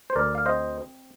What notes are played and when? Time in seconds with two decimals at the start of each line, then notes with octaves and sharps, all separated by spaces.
0.10 C5
0.16 D2 A#4 D5
0.35 F5
0.46 C4 C5 D#5